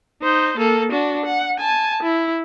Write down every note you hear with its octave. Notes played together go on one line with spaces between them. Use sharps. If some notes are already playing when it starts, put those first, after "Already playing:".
D#4 C5
A#3 A4
D4 F#4
F#5
G#5 A5
E4